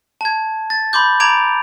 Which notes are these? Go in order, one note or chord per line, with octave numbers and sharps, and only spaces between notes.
A5 G#6
A6
B5 C6 D6 G6
A#5 B5 D6 G#6 D7 F7